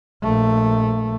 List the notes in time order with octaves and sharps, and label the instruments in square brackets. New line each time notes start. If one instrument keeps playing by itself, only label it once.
[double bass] A#1 A3